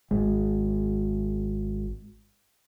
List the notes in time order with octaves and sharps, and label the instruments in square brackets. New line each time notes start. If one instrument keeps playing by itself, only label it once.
[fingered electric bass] G#1 G#3